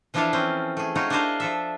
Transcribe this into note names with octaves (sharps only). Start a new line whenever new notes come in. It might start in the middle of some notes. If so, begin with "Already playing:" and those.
E3 F3 D4 E4 A4 F5
C4 C#4
A3 G#4
D#4 F4 F#4 C#5
D4 E4 A#4 C5 D#5 F5
F3 A4 E5